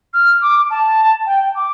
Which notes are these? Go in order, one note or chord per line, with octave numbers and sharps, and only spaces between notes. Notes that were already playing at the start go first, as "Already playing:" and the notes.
F6
D6
A5
G5
D6